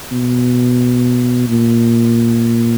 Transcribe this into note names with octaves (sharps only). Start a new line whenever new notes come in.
B2
A#2